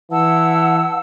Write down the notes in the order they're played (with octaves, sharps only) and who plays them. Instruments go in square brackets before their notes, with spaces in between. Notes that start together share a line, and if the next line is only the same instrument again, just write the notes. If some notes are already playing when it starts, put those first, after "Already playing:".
[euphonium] E3 [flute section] F#5 A5 E6